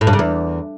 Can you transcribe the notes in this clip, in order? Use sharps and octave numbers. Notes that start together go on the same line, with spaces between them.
A2
G2
C#3
E2